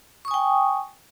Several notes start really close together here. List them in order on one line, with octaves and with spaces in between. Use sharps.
C#6 D#6 G#5 G5